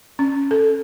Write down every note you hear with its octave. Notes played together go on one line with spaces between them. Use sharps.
C#4
A4